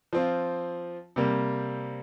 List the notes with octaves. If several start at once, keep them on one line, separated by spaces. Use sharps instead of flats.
F3 C4 F4
C3 G3 A#3